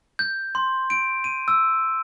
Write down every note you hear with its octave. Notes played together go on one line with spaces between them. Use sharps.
G6
C6
D7
D#7
E6